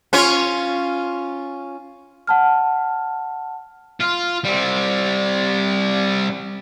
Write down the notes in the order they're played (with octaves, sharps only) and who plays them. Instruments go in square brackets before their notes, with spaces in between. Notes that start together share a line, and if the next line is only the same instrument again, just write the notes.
[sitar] C#4 F4 C#5
[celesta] F#5 A5 F6
[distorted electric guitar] F4
G3 C4